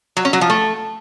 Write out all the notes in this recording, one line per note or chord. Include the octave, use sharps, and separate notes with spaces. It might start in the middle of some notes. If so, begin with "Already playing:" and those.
F#3
C#4
F#3
F3
A3